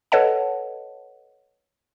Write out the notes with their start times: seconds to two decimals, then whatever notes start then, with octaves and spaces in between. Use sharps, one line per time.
0.12 A4 B4 C#5 D#5 F#5 A5